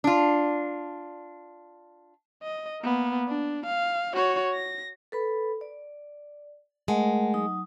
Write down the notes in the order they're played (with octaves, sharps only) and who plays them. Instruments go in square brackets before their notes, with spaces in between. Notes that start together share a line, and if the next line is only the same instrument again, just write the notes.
[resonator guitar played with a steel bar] D4 F4
[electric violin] D#5
A#3 B3
D4
F5
F#4 C#5
A#6
[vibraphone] A4 B4 B5
D5
[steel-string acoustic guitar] G#3 [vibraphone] A3 A#4 F#5
[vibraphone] F#3 D#4 D#6